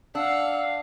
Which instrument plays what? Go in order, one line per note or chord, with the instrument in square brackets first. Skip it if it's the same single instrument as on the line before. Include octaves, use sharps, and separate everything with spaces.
[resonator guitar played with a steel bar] D4 [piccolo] F5 [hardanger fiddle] F#5 [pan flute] E6